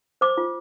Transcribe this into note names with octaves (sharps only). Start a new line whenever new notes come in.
C5 D6
F4